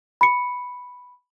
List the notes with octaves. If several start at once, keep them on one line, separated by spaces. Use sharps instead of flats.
B5 C#7